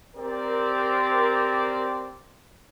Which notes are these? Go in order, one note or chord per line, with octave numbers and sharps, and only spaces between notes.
C4 G4 A#4 D5